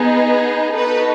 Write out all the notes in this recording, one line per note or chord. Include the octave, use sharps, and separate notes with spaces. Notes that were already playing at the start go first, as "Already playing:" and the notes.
Already playing: B3 D#4 G#4
B3 D#4 F#4 A4 B4